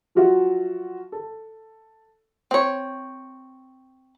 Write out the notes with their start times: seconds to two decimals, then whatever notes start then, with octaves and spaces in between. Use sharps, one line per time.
0.15 F3 F#3 F4 F#4 E5
1.12 A4
2.51 C4 C#5